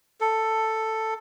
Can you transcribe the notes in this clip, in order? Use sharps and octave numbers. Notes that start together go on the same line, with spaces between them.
A4